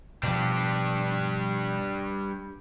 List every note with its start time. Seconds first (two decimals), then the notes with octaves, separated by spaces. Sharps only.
0.23 B2 F3 G3 D4